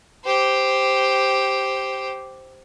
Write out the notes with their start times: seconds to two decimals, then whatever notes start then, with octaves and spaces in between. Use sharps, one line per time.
0.25 G4 C5